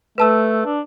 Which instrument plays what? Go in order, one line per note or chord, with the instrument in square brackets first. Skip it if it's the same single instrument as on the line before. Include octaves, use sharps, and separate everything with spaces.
[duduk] A3 [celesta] B4 A5 E6
[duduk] D4